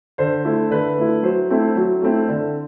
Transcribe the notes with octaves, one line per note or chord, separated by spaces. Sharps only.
D3 C5
A3 E4
D3 B4
A3 E4
F#3 C5
A3 C4 E4
F#3
A3 C4 E4
D3